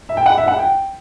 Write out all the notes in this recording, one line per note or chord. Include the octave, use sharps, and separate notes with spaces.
E5
G5
F#5
E5
F#5
G5